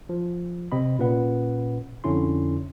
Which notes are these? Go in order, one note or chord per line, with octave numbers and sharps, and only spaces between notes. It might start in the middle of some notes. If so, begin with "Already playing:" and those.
F3
C3 C4 D#5 B5
A#2 C#4 B4 F#5
F2 D3 C#4 E4 C6